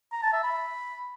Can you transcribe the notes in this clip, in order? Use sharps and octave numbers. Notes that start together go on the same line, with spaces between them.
A#5
A5
E5
B5